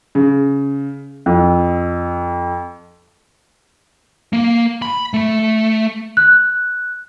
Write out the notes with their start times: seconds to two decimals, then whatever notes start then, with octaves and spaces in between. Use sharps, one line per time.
0.15 C#3
1.26 F2
4.33 A#3
4.82 B5
5.14 A3
6.17 F#6